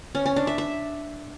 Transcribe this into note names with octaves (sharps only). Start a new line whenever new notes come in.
C#4
C#4
D4
E5
E5